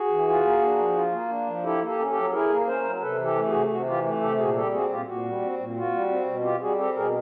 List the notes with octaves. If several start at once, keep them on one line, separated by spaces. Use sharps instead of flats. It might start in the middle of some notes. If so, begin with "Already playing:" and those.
Already playing: F#4 G#4
E3
F4
A#3
D4
F3
F4
A#3
D4
F3
E4 G4 A4
A#3
G4 A4
C#4
G4 A4
F#3
E4 G#4 A#4
A#3
C#4 A#4 C5
F#3
C3 A4 B4
E3
G4 A4
A3
F#4 G#4
C3
C3 F#4
E3 F4 G4
A3
C3 G4 A4
A#2 F#4 G#4
G3 G4 A4
C4 F#4 G#4
A#2 F4 G4
A#2 F#4
G3
C4
A#2
F4 F#4
G3
C4
B2
F4 G4
G3 F#4 G#4
C4 G4 A4
B2 G#4 A#4